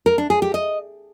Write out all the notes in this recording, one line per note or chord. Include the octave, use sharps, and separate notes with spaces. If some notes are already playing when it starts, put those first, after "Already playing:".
A#4
D4
G#4
G4
D#5